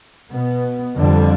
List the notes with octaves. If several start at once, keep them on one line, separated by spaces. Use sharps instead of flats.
B2 B3
F2 D3 G3